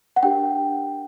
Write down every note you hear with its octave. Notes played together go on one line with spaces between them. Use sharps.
F#5
D4 G4 A#4 G5